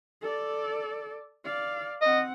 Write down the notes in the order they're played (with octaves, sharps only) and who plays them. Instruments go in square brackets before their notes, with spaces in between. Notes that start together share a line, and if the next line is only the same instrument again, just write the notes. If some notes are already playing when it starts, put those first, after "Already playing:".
[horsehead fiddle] A4 D5
D5 F5
[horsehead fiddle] C4 F#5 [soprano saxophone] D#5